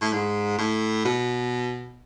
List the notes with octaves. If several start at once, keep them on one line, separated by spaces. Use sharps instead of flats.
A2
G#2
A2
B2